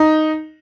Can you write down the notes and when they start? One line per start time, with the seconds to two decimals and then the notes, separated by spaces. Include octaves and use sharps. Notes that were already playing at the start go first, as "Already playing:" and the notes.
Already playing: D#4